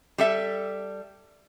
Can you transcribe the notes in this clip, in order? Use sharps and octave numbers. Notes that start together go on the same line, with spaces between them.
G3 A4 E5